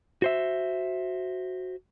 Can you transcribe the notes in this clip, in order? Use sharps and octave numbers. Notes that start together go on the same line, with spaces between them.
F#4 C5 E5